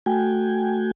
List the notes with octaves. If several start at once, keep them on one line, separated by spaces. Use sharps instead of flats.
A3 F#4 G5 G#5